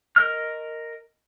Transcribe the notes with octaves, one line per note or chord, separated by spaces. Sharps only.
A#4 D#5 F6